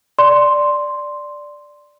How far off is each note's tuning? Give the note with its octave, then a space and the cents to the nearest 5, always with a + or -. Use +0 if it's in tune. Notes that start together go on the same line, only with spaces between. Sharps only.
D5 +0 C6 +0